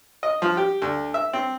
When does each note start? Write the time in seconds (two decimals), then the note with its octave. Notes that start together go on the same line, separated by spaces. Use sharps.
0.23 D#5
0.42 F3
0.57 G4
0.82 D2
1.14 E5
1.33 C4